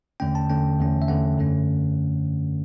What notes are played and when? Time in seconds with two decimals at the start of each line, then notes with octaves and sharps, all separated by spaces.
0.20 E2 D3 A3 C#4 G5
0.35 A5
0.49 E2 D3 A3 C#4 G5
0.79 E2 D3 A3 C#4
1.02 E5
1.08 E2 D3 A3 C#4 F#5
1.38 F#2 D3 A3 C#4